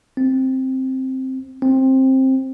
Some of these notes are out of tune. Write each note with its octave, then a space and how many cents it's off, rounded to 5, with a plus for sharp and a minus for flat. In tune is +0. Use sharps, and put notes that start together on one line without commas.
C4 +5
C4 +15